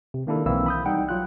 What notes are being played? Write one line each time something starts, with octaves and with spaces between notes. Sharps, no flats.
C3
D#3 A#3 D4 E4 A4
B1 E3 A#3 C4 E4 E6
B5 D#6 G6
G3 D#4 F#5 G5
F#3 F4 F#6